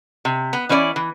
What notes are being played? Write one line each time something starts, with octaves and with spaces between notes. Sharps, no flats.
C3
B3
E3 C#4 E4 C#5 D5
E3